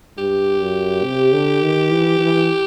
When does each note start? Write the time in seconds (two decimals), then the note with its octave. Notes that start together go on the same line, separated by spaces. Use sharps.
0.18 G2 G4
0.61 F#2
1.04 C3
1.33 D3
1.62 D#3
1.91 E3
2.19 E3